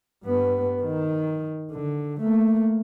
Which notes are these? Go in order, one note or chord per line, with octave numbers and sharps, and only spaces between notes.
G2 B3
D#3
D3
A3 A#3